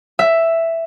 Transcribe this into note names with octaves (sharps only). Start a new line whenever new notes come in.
E5